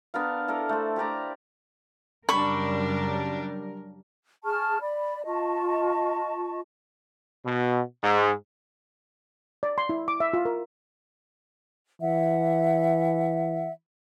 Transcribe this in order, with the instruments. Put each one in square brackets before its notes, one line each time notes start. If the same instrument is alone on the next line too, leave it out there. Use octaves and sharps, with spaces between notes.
[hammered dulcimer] B3 D4 A#4 F5
E4 A4 A#4 D5
A3 C5
G4 A#4 D5 A#5
[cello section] F#2 C#3 A#4 [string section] G3 D4 [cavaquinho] B5 C#6
[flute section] G#4 A5 C#6 F6
D5 B5
F4 D#5 A5 C#6
[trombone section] B2
G#2
[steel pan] D5
C6
E4
D6
E5
F4
A#4
[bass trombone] E3 [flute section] E5 F#5